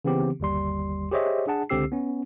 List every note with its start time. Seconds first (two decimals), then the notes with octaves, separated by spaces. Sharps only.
0.05 C#3 E3 B3 C4 G4
0.40 G1 D#2 G3 C6
1.12 G4 G#4 C5 C#5 D#5 E5
1.47 D4 G#4 F#5 A5
1.69 C#2 D3 C4 G4 E6 C7
1.92 B3 C#4